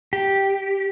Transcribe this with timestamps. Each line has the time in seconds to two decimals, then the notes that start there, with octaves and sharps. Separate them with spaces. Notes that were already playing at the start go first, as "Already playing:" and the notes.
0.13 G4